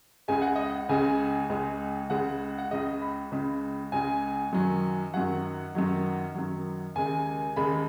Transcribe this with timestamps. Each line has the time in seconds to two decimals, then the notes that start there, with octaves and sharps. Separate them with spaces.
0.28 C#2 C#3 G#3 G#5
0.42 F#5
0.56 D#5
0.69 F#5
0.89 C#2 C#3 G#3 G#5
1.50 C#2 C#3 G#3
2.10 C#2 C#3 G#3 F#5
2.58 F#5
2.71 C#2 C#3 G#3 D#5
3.01 B5
3.32 C#2 C#3 G#3
3.92 C#2 C#3 G#3 G#5
4.53 F#2 D#3 F#3
5.14 F#2 D#3 F#3 F#5
5.75 F#2 D#3 F#3
6.35 F#2 D#3 F#3
6.96 D#2 C#3 G#3 G#5
7.56 D#2 C#3 G#3 B5